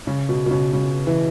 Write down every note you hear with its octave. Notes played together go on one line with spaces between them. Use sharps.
C#3
B2
B2
C#3
C#3
E3